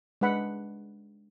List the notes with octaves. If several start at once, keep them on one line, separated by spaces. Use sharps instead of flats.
G#3 D4 B4 F#5 B5